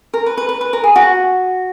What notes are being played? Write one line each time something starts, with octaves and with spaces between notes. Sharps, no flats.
A#4
B4
B4
B4
B4
A#4
G#4
F#4